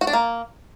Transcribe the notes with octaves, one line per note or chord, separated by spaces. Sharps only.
F#4
D4
A#3